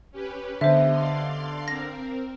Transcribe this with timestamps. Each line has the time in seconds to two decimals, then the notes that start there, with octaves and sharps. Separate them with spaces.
0.12 C#4 G4 B4
0.61 D3 B3 G4 C5 D#5 E5
0.91 D5 F5 C6
1.68 C4 A#4 A#6